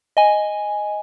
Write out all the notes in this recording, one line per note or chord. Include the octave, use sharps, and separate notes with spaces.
D#5 G#5